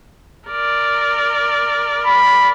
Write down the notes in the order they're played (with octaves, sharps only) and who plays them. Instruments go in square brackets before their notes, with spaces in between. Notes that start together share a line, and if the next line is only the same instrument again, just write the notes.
[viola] A#4 D5
[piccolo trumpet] B5